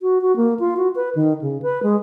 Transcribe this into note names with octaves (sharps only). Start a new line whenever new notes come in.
F#4
F#4
A#3
F4
F#4
B4
D#3
C#3
B4
G#3